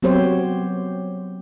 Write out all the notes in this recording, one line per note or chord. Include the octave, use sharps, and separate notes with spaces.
F#3 B3 C4 G4 C5 C#5